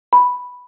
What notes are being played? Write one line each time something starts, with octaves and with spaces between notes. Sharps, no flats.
B5